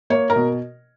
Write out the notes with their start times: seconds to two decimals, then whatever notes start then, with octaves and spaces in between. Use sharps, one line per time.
0.10 A#3 C#5
0.30 A#4
0.36 B2